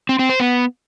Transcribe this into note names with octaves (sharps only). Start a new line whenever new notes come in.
C4
C4
C5
B3